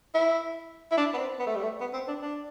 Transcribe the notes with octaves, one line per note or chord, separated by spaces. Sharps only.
E4
E4
D4
B3
C4
B3
A3
G3
A3
B3
C4
D4
D4